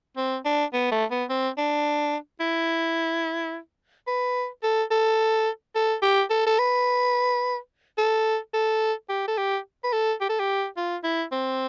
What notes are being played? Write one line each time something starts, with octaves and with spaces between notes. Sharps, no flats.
C4
D4
B3
A3
B3
C4
D4
E4
B4
A4
A4
A4
G4
A4
A4
B4
A4
A4
G4
A4
G4
B4
A4
G4
A4
G4
F4
E4
C4